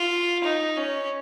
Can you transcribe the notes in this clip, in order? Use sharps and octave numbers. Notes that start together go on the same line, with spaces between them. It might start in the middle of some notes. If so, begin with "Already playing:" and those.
Already playing: F4
D#4
C#4